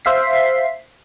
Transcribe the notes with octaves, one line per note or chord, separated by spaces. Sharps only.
C5 E5 F5 B6 C7